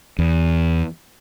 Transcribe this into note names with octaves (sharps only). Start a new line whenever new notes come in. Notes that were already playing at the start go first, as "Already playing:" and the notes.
E2